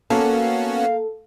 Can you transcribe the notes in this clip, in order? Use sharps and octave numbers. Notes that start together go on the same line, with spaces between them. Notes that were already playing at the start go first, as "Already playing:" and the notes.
A#3 B3 C#4 F#4 A4 F5